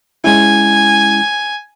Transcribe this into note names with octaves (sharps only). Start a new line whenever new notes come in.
G#3 C#4 E4 G#5